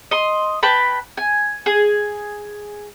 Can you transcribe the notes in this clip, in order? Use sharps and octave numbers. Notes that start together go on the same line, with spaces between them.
D#5 C6
B4 G5 A5 B5
G#5
G#4